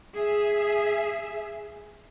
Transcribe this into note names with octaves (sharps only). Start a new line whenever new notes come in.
G#4 E5